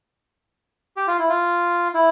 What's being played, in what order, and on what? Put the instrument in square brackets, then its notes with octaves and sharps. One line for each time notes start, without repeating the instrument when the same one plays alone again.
[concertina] G4
F4
E4
F4
E4